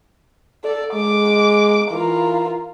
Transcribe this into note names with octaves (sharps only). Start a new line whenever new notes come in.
A4 D5
G#3 D6
E3 F4 A#4